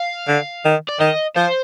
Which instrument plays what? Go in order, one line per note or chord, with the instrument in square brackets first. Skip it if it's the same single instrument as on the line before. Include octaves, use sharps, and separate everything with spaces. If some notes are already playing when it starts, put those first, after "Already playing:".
Already playing: [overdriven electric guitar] F5
[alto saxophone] D3
D#3
[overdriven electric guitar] D5
[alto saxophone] D#3 [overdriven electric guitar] D#5
[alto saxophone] F3 [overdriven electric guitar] C5